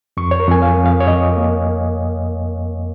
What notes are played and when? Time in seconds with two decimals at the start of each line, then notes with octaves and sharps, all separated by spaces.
0.17 F2 C#6
0.31 C#5
0.40 A#4
0.47 F2 G#5
0.62 F5
0.78 F2
0.85 F5
1.00 C#5
1.07 F2 D#5
1.37 A#3